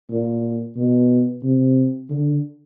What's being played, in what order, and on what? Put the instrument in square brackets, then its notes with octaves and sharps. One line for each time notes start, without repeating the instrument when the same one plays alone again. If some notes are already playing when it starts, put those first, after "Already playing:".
[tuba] A#2
B2
C3
D3